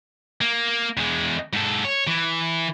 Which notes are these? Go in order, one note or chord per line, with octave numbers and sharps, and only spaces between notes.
A#3
E2 G#3
G#2 A4
C#5
E3